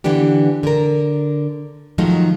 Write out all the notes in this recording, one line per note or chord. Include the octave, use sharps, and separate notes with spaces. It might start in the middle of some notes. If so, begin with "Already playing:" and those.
D3 E3 B3 D4 G4
D3 A#4
D#3 F3 F#3 G#3 A3 D#4